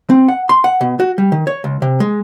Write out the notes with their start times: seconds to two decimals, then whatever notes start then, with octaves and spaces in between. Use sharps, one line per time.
0.10 C4
0.28 F#5
0.49 C6
0.64 F#5
0.81 B2
1.00 F#4
1.18 G3
1.32 D#3
1.47 C#5
1.64 C#2
1.82 C3
2.00 G#3